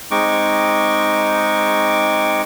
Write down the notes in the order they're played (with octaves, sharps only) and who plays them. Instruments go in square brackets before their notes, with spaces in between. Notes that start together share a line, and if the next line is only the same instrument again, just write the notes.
[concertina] G#3 C4 D#4 C#6 D6